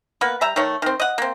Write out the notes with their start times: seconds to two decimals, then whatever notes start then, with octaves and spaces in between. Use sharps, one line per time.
0.21 A#3 B3 B4
0.41 G3 E5 A#5
0.56 D#3 A3 C#5
0.82 D#3 C4
1.00 D#5 F#5
1.18 A#3 C4